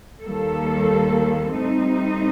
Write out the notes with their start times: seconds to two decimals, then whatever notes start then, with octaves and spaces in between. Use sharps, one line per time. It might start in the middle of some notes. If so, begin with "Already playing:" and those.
0.23 D#2 D#3 G3 A#3 A4
1.56 A2 G3 C4 D#4